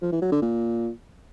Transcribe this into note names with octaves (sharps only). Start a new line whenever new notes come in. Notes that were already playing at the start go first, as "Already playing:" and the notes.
F3
E3
F#3
D3
A#2